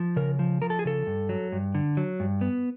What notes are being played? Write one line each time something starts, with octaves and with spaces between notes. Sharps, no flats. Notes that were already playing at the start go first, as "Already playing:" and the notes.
Already playing: F3
C#3 A#4
F3
F3 A#4
A4
G#4
C#3 A4
G2
F#3
G2
D3
F#3
G2
B3